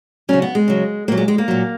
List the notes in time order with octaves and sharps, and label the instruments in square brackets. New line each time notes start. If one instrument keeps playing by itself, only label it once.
[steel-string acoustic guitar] C#3 F#3 C#4
B3
G#3
C#3 F#3
A#2 F#3 A#3
G#3
G#3
A#3
A#2 F#3